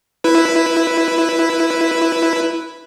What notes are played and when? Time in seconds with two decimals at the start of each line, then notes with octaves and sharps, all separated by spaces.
0.24 E4 B4